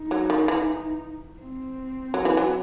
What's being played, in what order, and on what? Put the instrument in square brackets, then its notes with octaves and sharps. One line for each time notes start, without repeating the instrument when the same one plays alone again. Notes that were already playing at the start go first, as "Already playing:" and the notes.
Already playing: [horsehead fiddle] D#4
[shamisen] F#3
D#3
E3
[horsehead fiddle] C4
[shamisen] F#3
E3
F#3